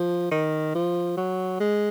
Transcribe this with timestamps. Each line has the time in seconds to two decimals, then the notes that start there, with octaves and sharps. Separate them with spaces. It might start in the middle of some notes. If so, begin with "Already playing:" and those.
Already playing: F3
0.31 D#3
0.75 F3
1.17 F#3
1.60 G#3